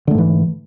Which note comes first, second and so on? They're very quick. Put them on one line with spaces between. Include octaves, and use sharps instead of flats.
D3 A3 G#2 E3